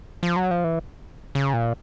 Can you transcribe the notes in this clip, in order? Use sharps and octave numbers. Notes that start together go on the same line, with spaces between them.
F3
F#3
F3
E3
C#3
A#2